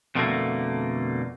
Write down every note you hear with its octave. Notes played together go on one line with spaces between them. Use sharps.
F2 B2 D3 E3 A3 A#3